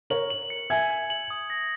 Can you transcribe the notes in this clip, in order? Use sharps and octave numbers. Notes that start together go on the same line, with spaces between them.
A#4 C#5 F#7
F#7
C#7
E5 G#5 G#6
G#6
F#7
D#6
A#6